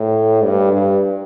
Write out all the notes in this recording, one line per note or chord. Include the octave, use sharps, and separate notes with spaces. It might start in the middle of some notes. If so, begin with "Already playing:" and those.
Already playing: A2
G2
G2